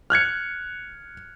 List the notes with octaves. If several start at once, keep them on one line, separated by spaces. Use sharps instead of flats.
F6 F#6 G#6 C#7